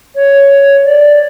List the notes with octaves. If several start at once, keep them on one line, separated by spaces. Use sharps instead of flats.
C#5
D5